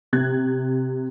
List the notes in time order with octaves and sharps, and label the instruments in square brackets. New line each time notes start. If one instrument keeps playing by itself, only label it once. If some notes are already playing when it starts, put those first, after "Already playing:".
[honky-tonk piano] C3 F#6 G#6